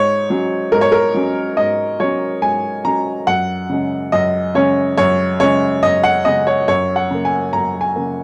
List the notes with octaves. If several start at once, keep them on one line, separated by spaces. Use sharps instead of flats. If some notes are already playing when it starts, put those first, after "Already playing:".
Already playing: G#2 C#5
F#3 C#4
G#2 A#4
C#5
A#4
F#3 C#4
G#2 D#5
F#3 C#4 C#5
G#2 G#5
F#3 C#4 A#5
F#2 F#5
C#3 G#3 C#4
F#2 D#5
C#3 G#3 C#4 C#5
F#2 C#5
C#3 G#3 C#4 C#5
F#2 D#5
F#5
C#3 G#3 C#4 D#5
C#5
F#2 C#5
F#5
C#3 A#3
G#5
F#2 A#5
G#5
C#3 A#3